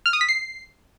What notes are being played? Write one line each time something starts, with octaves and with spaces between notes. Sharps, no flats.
F6
D#6
B6
C7